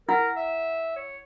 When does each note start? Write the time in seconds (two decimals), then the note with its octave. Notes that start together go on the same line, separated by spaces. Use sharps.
0.09 E4 A#4 F#5
0.36 E5
0.96 C#5